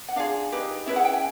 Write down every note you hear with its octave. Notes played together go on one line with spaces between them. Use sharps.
F#5
D4 F4 G#4 F5
D#4 G4 B4
C#4 E4 G#4 B4 E5
F#5
G5
G#5